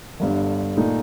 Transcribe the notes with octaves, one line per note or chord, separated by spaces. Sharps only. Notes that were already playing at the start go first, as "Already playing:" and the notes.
G1 G2 D3
A#2 A3 D#4